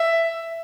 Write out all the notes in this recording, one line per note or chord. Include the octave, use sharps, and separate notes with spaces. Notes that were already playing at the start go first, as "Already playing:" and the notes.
Already playing: E5